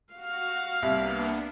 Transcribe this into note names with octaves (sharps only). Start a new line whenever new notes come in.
F#4 F5
C2 A#3 B3 D4